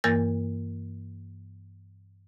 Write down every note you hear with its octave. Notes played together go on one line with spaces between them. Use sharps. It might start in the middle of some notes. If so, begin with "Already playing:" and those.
G2 E3 A#3 A#4 G6 A6